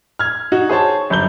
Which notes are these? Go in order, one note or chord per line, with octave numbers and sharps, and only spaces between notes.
F6 G#6
D#4 F#4
G#4 C5 C#5 A5
G1 F#2 G6 G7